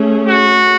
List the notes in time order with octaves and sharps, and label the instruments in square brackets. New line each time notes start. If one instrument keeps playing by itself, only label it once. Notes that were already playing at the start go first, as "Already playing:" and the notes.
Already playing: [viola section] A3 C#4 G#4
[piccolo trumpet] F#4